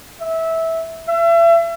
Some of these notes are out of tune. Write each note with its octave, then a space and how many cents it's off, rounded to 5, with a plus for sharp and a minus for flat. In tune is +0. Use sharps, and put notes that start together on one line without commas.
E5 -15
E5 +35